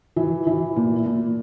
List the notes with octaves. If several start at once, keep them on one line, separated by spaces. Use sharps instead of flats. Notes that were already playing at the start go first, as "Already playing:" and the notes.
E3
E3
A#2
A#2